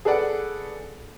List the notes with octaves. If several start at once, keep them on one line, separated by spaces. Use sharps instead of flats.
G#4 A4 B4 D5 F#5